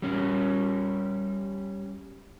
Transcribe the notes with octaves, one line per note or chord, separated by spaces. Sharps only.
G3 C#4